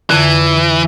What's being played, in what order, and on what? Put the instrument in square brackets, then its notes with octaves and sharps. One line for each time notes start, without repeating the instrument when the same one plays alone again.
[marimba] F2 D3 [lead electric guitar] E3